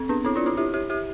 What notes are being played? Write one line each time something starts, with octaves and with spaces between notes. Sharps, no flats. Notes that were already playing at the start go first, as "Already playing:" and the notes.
Already playing: C4
B3 D4
C4 E4
D4 F4
C4 E4
E4 G4
E4 G4
E4 G4